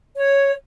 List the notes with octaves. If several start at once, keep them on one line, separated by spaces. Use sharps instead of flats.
C#5